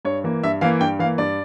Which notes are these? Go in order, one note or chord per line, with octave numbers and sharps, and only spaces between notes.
G2 C#5
E3 A#3
G2 E5
E3 A#3 F5
G2 G5
E3 F5
A#3
G2 D5